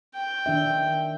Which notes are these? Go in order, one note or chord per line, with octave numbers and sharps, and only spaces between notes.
G5
D#3 D4 E5